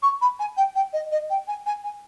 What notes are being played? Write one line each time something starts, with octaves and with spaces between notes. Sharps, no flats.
C#6
B5
G#5
G5
G5
D#5
D#5
G5
G#5
G#5
G#5